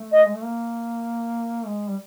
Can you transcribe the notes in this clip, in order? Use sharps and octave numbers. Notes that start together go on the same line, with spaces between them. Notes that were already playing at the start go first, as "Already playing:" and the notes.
Already playing: A3
D#5
G#3
A3
A#3
G#3
G3